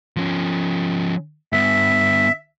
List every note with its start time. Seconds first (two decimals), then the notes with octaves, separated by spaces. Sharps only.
0.17 F3 C#4
1.53 G2 B3 E5